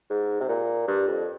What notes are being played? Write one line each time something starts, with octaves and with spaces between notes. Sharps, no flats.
G#2
C3
A#2
G2
F2